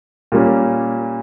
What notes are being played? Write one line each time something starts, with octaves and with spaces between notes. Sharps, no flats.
A#2 G3 A#3 C#4